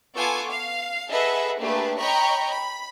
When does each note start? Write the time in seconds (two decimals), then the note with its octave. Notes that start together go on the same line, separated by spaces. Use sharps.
0.16 B3 F4 A4 G#5 C#6 D6
0.50 F5
1.10 G#4 A4 B4 D#5 E5 F#5
1.59 A3 A#3 D4 G4 G#4 B4
1.98 C#5 D#5 G5 A#5 B5 C#6
2.48 B5